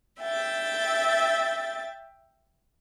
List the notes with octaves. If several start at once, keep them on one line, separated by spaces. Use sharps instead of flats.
E5 G5 A6